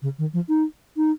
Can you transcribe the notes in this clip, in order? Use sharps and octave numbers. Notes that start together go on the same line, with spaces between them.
C#3
D#3
F3
D#4
D#4